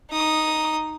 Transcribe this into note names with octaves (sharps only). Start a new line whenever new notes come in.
D#4 D#6